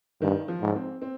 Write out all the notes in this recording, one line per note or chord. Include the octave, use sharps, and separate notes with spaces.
G2 D#3
F3
G#2
C4
C4